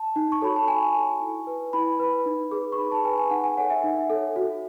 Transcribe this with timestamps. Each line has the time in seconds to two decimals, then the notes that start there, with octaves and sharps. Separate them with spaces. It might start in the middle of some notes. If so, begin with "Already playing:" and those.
Already playing: A5
0.16 D#4
0.32 C#6
0.42 F#4 A4 C#5 B5
0.56 A5
0.68 D#4 G#5
0.94 F#4 A4 C#5
1.21 E4
1.47 B4
1.73 E4 B5
2.00 B4
2.26 D#4
2.51 G#4 B4
2.72 C#6
2.78 D#4 B5
2.91 A5
3.05 G#4 B4 G#5
3.18 G#5
3.31 D#4 F#5
3.44 G#5
3.57 A4 C#5 F#5
3.70 E5
3.84 D#4
4.10 A4 C#5
4.36 F#4